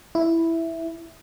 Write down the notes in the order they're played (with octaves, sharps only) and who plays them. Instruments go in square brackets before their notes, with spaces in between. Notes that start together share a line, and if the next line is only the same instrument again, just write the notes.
[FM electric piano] E4